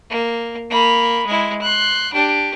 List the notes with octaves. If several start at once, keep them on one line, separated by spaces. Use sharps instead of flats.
A#3
A#3 B5
G#3 E4
C6 F#6
D4 G4